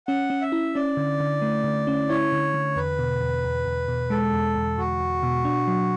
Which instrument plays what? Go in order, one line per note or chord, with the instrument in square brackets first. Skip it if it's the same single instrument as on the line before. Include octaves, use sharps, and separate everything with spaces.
[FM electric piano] C#4 [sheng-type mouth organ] F#5
[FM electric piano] C#4
[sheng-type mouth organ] E5
[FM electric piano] E4
[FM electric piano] C#4 [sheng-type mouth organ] D5
[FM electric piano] D3
D3
A3
D3
C#4
[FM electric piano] E4 [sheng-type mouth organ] C#5
[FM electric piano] D3
D3
[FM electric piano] E2 [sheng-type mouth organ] B4
[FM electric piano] B2
E2
E2
E2
B2
[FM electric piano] G#3 [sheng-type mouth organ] A4
[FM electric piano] E2
E2
[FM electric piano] E2 [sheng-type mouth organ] F#4
[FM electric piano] E2
B2
D4
F#3